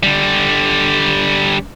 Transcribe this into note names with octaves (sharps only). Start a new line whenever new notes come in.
D3 G3